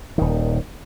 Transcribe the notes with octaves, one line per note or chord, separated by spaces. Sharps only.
D#1 D#3